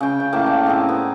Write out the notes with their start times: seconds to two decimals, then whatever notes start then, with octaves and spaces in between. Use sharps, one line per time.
0.01 C#3 G5
0.20 G5
0.33 A2 A#3 A5 D6
0.46 D5
0.65 A2 C4 D#4 G#4
0.89 B3